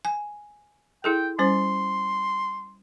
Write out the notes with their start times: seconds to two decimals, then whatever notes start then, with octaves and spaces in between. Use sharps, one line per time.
0.05 G#5
1.04 E4 G#4 A4 G5
1.39 G3 C#4 C5 C6